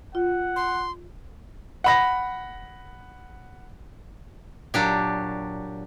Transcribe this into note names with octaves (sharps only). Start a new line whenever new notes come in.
F4 F#5
C6
F#5 B5 A#6
A#2 F#3 D4 G4